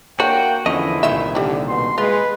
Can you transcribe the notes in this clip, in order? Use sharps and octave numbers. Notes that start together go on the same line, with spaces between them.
A#3 D4 F#4 C#5 G5
E2 D3 F3 C#4 E4 D#5
C2 A#2 D#3 E5
D3 G3 E4
B2 C6
G#3 F4 B4